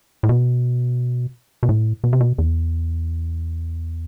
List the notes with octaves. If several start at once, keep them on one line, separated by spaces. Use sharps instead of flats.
A2
B2
B2
A2
B2
C3
B2
E2